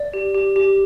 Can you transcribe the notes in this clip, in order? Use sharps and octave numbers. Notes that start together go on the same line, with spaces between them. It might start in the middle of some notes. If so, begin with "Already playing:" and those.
Already playing: D5
G4
G4
G4